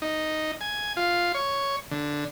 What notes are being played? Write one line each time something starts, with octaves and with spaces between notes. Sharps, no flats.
D#4
G#5
F4
C#5
D3